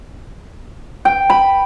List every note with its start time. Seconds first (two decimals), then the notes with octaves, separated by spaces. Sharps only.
1.05 G5
1.30 B5